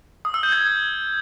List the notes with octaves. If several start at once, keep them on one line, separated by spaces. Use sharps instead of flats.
D#6
E6
G6
G#6